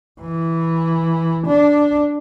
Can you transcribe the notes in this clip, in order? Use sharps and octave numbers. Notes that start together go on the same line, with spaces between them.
E3
D4